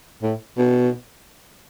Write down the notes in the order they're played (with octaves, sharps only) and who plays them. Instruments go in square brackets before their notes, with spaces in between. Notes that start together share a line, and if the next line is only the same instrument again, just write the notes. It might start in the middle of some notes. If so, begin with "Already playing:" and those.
[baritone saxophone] A2
B2